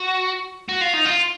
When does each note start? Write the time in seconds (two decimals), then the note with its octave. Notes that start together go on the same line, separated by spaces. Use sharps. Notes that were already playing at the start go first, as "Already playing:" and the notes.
Already playing: F#4
0.69 F#4
0.81 F4
0.93 D#4
1.05 F4